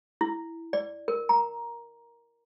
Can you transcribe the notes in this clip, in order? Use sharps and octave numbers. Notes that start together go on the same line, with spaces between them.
E4
D5
A#4
A#5